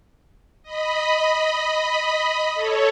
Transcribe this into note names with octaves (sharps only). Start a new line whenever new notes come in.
D#5 B5
A4 C#5